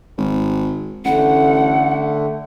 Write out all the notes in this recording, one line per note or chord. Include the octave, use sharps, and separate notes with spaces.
G#1
A1 D3 A3 F#5